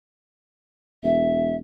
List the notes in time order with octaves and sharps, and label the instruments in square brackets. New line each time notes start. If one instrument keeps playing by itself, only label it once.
[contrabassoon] E1 [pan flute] E5